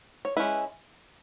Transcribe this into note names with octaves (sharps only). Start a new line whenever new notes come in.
C#5
G#3 C#4 E4 B4